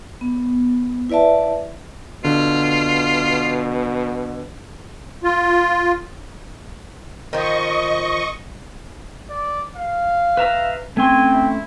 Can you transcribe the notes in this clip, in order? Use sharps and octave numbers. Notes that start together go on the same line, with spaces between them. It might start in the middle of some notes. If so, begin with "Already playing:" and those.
B3
E4 B4 D5 E5 A5
B2 D3 F4
F4
D#3 F3 D#5 C#6
D5
F5
B4 E5 A#5
A3 C4 C#4 G#5 C6
E4